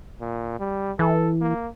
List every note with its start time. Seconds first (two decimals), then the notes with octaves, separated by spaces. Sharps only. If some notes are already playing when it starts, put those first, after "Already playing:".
0.21 A#2
0.59 G3
0.99 E3 A4
1.41 A#3